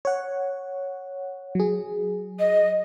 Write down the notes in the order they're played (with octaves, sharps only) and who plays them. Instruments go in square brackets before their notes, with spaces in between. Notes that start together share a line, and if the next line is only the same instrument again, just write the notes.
[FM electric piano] C#5 F#5
F#3 G#4
[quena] D#5